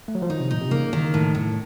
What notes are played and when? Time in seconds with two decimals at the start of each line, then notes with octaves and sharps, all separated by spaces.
0.08 A3
0.15 F#3
0.22 F3
0.30 D#3 D#4
0.41 C3
0.51 A#2 D#4
0.61 C3
0.71 C#3 A#3
0.93 D#3
1.14 A2
1.35 A2